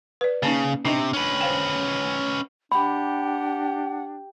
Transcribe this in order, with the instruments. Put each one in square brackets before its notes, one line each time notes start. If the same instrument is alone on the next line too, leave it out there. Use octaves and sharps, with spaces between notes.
[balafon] B4 D5
[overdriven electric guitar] C#3 [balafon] A#3 C#4 D#4
[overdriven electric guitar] C3 [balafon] D4 D#4 D#5
[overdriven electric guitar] C#4 B4
[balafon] C5 F5 G5
[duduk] D4 [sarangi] G4 [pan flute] F#5 [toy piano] B5